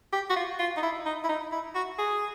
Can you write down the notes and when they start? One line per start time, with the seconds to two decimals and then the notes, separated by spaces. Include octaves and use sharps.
0.13 G4
0.30 F#4
0.36 F4
0.59 F4
0.77 D#4
0.83 E4
1.06 D#4
1.24 E4
1.29 D#4
1.52 E4
1.75 F#4
1.99 G#4